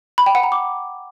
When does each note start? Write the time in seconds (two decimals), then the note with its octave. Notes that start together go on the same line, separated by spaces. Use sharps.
0.18 B5
0.26 G5
0.35 F#5
0.43 A#5
0.52 D6